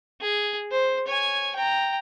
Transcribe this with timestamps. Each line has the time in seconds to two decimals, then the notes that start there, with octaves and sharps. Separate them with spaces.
0.21 G#4
0.71 C5
1.07 C#5 G#5
1.55 G5 A#5